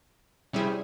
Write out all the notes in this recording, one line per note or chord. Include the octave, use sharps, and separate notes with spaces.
C3 G3 C#4 E4 G#4